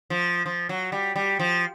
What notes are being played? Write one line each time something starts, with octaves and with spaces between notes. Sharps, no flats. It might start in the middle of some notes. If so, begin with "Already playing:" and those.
F3
F3
F#3
G3
G3
F3